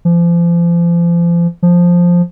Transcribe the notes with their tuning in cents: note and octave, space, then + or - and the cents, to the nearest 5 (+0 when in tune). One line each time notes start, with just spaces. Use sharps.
F3 -35
F3 +5